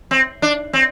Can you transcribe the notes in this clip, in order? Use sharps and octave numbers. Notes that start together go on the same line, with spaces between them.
C4
D4
C4